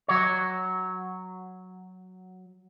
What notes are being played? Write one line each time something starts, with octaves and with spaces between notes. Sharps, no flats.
F#3 C#5